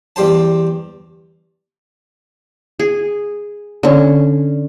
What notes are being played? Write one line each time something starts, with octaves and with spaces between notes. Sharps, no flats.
E2 G3 G4 C5 A5
G#4
D3 C#4